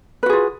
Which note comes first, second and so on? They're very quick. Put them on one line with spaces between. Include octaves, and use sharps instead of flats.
B4 F#4 G#4 F4